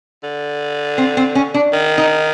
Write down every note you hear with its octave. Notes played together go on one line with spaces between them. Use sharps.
D3
C4
C4
C#4
D4
D#3
D#4